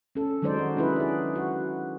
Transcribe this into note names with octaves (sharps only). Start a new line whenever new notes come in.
C#4 A4
D#3 F#3 G#3 D#4 C5 D5
F#4
C#4 D4 E4 G#4 B4
G#4 D5
F#4